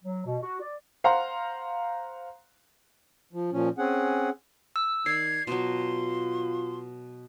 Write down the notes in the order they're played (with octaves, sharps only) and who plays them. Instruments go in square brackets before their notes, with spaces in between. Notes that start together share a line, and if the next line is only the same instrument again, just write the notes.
[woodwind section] F#3
B2
F#4
D5
[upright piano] C5 F5 F#5 A#5 C6
[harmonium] F3
A#2 F3 C#4
C4 C#4 G#4 F#5
[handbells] E6
[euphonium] D#3 [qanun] D5 [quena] G#6 [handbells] C7
[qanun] B2 F#3 [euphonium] F4 [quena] C6